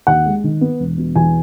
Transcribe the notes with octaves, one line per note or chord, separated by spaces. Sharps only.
D#2 F#5
G#3
D#3
B3
E1
B2
E2 G#5